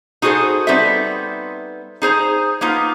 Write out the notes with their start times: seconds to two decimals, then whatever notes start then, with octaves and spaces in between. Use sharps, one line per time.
0.22 D#4 F#4 G#4 A4 C5
0.67 G3 B3 C4 D#4 A4 E5
2.02 D#4 G#4 C5 A#5
2.61 A#3 B3 D#4 F4